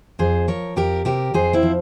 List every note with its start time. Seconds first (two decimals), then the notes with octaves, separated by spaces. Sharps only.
0.19 F2 G#4 C5
0.48 F3 A#4 C#5
0.76 F2 G4 A#4
1.05 C3 G4 A#4
1.34 F2 G#4 C5
1.53 C4 E4
1.63 F3